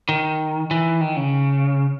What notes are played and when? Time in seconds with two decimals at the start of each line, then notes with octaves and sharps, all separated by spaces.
0.09 D#3
0.71 E3
1.01 D#3
1.16 C#3